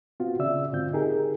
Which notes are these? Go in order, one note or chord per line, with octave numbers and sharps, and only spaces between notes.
B3 C4 F4 F#4
C#3 D5 E5 E6
G#2 D3 C4 F4 G6
D#4 G4 G#4 A#4